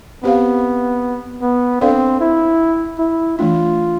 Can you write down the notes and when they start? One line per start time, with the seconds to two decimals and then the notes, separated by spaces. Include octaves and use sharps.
0.24 B3 C4 G4 C5 F5
1.42 B3
1.81 C4 D4 A4 D5 F5
2.21 E4
2.99 E4
3.39 E3 A3 D4 F4